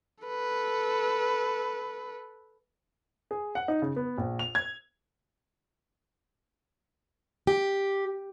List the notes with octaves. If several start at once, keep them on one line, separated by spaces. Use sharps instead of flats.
A4 B4
G#4
F#5
D#4
C#3
B3
A#1
F7
G#6
G4